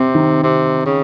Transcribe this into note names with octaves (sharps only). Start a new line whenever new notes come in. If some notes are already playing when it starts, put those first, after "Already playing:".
Already playing: C3 C4
D#3
C3
C#3